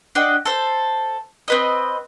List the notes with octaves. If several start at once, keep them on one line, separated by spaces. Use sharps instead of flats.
D4 F#4 G4 D#5
A4 C5
C4 B4 D#5